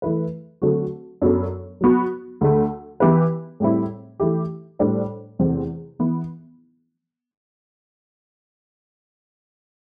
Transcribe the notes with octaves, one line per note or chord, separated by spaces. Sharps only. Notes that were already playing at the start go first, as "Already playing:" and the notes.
E3 A3 E4 B4
D3 F#3 A3 C4 F#4
F#2 F#3 B3 D4 A4
F#3 B3 F#4
D2 D3 A3
E3 B3 E4 G4 B4
A2 G3 C4 E4
E3 A3 E4 G4
A2 G3 D4 A4 C5
E2 C3 E3 A3 C4
E3 B3 E4